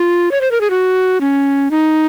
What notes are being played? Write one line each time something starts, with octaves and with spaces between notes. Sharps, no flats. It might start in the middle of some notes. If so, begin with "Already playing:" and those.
Already playing: F4
C#5
C5
A#4
G#4
F#4
C#4
D#4